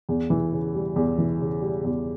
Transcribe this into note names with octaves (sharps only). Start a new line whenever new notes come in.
E2
E3
C#3
G3
E2
E3
C#3
G3
E2